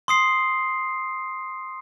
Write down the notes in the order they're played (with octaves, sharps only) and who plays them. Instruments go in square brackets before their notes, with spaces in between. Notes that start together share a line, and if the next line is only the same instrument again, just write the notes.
[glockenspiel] C6 D#6 C7